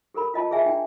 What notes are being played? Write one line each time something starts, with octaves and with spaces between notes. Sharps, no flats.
G4 A4 A#4 B5
F4 D#5 A5
G#4 D5 E5 G#5
D4 G5